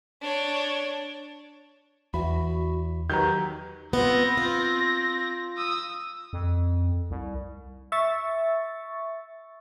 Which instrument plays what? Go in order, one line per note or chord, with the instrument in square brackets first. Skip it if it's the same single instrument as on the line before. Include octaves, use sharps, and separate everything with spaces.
[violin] D4 C#5
[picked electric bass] E2 [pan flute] F#4 [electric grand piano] B5
[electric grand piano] D#3 F#3 B4 [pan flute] G4 [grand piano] A#5 G6
[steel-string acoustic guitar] B3 F4 [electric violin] C4 A#6
[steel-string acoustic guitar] F4
[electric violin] D#6 E6
[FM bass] F2
C2
[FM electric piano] E5 C#6 A6